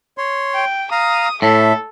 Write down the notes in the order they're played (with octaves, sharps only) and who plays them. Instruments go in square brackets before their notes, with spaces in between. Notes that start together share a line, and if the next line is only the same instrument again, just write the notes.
[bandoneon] C#5 C6
[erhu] G5
[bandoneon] F5 A#5 [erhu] D#6
[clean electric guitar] A2 [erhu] A4 [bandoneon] E5